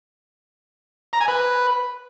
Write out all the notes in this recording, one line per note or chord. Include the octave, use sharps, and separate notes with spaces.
A#5
G#5
B4